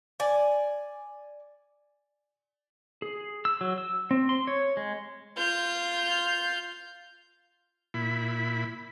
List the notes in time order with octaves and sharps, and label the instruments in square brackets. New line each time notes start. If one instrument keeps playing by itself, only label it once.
[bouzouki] D5 G#5
[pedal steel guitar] G#4
E6
F#3
E6
C4
C6
C#5
G#3
[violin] F4 G6
[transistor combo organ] A#2 E4 B5